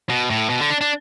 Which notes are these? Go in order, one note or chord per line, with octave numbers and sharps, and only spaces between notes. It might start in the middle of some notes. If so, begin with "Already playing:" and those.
B2
A2
B2
D3
D4
D4